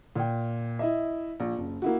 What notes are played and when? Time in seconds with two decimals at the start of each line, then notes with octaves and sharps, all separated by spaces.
0.16 A#2 G5
0.79 E4 D#5 E5
1.40 A#1
1.58 F#1
1.82 A#3 E4 F#4